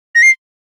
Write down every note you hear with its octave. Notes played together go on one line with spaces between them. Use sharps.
A#6
C7